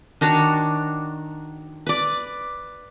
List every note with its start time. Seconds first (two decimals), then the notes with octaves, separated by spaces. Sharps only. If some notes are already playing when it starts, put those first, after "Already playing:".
0.21 D#3 D4 F#4 C#5
1.87 B4 D5